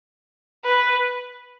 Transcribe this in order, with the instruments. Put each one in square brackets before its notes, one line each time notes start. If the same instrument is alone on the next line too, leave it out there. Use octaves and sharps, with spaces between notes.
[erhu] B4